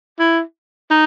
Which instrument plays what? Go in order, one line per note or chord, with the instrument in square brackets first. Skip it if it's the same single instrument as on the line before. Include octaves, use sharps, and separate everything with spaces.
[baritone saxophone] E4
D#4